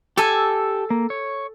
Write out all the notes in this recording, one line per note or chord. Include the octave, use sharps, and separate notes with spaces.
G4 A4 G#5 A5 E6
A#3
C#5